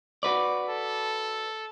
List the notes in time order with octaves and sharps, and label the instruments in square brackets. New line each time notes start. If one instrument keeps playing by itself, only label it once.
[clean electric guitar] F#4 B4 D5
[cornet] A4